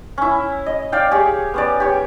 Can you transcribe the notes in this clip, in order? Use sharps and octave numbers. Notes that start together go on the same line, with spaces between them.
C#4 E4
D#5
D5 F5 G5
G4 G#4 C#5
B3 C#4 D5
G4 C#5